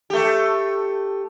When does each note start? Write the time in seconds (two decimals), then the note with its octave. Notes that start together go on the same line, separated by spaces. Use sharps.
0.10 A3 G4